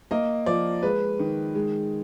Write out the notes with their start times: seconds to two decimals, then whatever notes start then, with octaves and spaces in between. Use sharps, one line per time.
0.11 A#3 D#5
0.46 F3 D5
0.83 G#3 B4
1.19 D#3
1.55 G#3